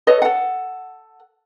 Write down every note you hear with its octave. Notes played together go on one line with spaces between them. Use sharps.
A4 B4 C#5 D#5
A4 F#5